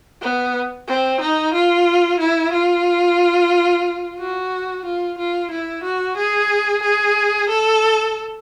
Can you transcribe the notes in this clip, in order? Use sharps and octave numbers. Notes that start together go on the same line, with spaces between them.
B3
C4
D#4
F4
E4
F4
F#4
F4
F4
E4
F#4
G#4
G#4
A4